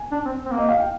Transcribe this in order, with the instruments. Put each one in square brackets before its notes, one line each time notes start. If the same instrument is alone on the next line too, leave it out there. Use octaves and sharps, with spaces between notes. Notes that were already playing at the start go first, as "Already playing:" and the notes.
Already playing: [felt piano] G#5
[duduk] D4
C4
C4
A#3
[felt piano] D#5
F5
G5